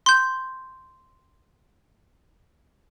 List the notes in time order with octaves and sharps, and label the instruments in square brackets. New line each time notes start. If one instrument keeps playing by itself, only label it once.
[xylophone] C6 G6